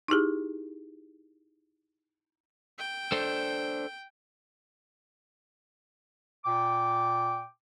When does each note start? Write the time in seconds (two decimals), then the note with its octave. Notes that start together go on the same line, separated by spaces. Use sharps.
0.08 D#4 E4 G4 G#4
2.79 G5
3.12 D4 A4 C5
6.44 A#2 G5 D6